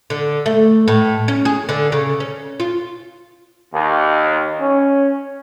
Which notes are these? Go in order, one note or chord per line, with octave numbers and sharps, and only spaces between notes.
D3
A3
A2
C#4
G#4
D3
C#3
C#4
F4
D#2
C#4